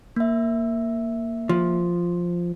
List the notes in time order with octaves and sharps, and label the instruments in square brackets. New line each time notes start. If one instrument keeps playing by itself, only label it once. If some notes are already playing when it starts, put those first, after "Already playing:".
[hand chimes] A#3 E5
[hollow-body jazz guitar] F3